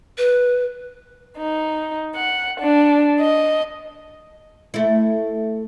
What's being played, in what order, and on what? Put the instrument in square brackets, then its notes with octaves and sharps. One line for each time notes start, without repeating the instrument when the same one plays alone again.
[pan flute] B4
[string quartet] D#4
F#5
D4
D#5
[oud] A3 E4